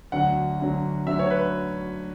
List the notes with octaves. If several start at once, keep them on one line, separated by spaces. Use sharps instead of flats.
D2 D3 F#3 F#5
D2 D3 F#3
D2 D3 F#3 E5
C#5
B4